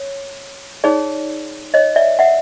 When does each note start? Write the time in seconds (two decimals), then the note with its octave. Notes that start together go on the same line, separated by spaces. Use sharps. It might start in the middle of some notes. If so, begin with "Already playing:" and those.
Already playing: C#5
0.84 D#4 G#4 C#5 D5
1.74 C#5 D#5
1.96 D5 E5
2.19 E5 F#5